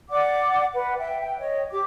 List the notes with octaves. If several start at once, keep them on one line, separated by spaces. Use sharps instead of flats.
D5 F#5 D6
B4 F#5
E5 G5
G5
C#5 D#5
G4 D6